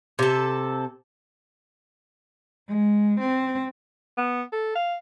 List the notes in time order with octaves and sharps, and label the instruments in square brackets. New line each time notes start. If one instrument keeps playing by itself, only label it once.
[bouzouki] C3 A4
[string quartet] G#3
C4
[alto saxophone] B3
A4
F5